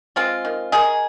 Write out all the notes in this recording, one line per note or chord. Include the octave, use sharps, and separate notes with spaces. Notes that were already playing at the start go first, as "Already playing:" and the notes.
G#3 C4 F4
D#3
D#3 D#4 G#4